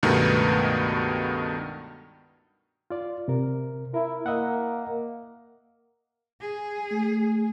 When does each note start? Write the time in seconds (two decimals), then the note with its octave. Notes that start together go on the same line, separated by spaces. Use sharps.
0.03 C#2 G2 B2 D#3 A3 B3
2.90 F4 D5
3.28 C3 A#4
3.94 E4 A#4
4.26 A#3 D#5 E5 F#5
6.41 G#4
6.91 A3